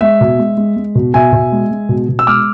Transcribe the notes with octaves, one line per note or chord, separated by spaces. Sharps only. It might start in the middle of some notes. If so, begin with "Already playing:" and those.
G#3 E5
B2
G#3
G#3
G#3
B2
B2 E5 G#5
B2
G#3
G#3
B2
B2
E6
G#3 D6 F6